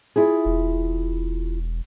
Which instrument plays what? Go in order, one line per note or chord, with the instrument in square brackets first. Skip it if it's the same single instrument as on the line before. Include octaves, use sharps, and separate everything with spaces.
[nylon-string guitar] E4 F4 G#4
[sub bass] E1